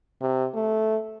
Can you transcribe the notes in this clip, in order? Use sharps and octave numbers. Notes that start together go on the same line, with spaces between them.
C3
A3